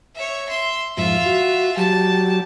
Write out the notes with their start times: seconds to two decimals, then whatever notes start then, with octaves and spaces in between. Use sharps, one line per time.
0.15 C#5 E5
0.49 E5 C6
0.97 F2 G#2 F4 E5
1.25 F#4
1.77 F#3 G4 A5